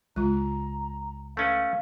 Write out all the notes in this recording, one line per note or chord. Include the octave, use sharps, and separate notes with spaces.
C#2 G#3 F4 A#5
A3 C#4 B4 F5